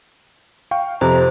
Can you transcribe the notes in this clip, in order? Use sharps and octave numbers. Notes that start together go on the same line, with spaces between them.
F5 G5 C#6
F2 C3 C5 A#5